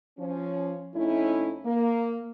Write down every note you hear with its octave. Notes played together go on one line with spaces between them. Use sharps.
F3 C#4
F2 A3 C#4 D#4 E4
A#3